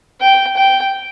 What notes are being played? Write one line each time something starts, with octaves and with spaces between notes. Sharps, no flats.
G5
G5